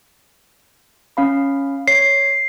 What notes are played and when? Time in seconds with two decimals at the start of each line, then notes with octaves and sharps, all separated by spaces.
1.17 C#4 F5 B5
1.88 C#5 C7